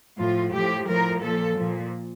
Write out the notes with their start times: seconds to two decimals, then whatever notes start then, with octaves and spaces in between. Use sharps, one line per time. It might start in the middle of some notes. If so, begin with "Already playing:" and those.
0.18 A2 F3 F4
0.52 A2 F3 G4
0.87 A2 F3 A#4
1.21 A#2 F3 A4
1.56 A#2 F3